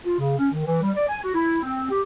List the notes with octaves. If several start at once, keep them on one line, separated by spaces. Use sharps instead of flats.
F4
C#3
C#4
D#3
E3
G3
D5
G#5
F#4
E4
C4
G4